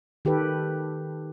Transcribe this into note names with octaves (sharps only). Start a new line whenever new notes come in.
D#3 G4 A4 B4